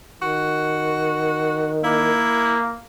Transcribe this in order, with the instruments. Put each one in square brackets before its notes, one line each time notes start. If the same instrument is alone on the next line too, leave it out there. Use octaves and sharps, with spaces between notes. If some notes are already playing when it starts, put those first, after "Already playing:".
[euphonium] D#3 [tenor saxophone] F#4
[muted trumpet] A#3 [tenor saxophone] E4